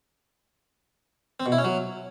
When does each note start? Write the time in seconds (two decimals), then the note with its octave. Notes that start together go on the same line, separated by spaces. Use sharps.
1.40 C4
1.46 B2
1.52 E4
1.58 C#4
1.64 F#3